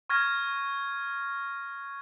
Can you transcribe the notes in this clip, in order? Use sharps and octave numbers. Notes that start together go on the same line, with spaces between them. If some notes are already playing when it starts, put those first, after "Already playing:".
C#6 F6 G#6 A#6